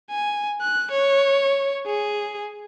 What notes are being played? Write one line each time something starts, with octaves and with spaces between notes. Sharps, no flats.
G#5
F#6
C#5
G#4